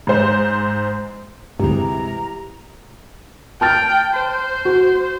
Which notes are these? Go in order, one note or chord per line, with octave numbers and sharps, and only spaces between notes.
G#2 C5
D2 G2 C3 E3 G#3 E4 G4 A#5
G5 A5 F6 A6
C5
F#4